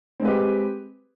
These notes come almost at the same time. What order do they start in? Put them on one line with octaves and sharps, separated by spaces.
C4 G#3 B4 G4